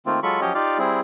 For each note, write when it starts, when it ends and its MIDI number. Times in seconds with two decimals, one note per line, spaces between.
0.06 0.20 51
0.06 0.20 57
0.06 0.20 58
0.06 0.20 60
0.06 0.20 65
0.23 0.40 54
0.23 0.40 56
0.23 0.40 65
0.23 0.40 69
0.23 0.40 83
0.23 0.40 85
0.41 0.53 53
0.41 0.53 54
0.41 0.53 61
0.41 0.53 67
0.41 0.53 73
0.41 0.53 75
0.54 0.78 63
0.54 0.78 65
0.54 0.78 67
0.54 0.78 74
0.54 0.78 77
0.78 1.01 55
0.78 1.01 60
0.78 1.01 64
0.78 1.01 68